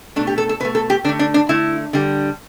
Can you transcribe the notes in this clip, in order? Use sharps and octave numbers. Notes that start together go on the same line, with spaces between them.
B2 A3 D4
G4
A4
A4
B2 A3 B4
A4
G4
D3 A3 D4
D4
D4
D3 A3 E4
D3 G3